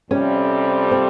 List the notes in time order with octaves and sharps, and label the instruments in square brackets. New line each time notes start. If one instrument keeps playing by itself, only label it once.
[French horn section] F2 C3 G3 [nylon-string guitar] C#4
[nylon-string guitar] C4